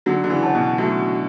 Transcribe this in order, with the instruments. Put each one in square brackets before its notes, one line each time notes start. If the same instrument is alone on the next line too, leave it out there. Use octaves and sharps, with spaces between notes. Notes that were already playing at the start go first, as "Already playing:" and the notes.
[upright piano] D3 F#3 [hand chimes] F#4
[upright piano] D3
C#3 E3
[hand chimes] C#5 F#5 A5
[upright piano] B2
[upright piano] F#3 A3 [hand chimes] F#4